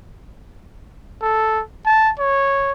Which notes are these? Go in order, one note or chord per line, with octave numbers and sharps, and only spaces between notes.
A4
A5
C#5